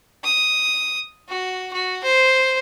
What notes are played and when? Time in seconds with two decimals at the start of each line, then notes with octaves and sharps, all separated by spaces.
0.24 D#6
1.29 F#4
1.73 F#4
2.04 C5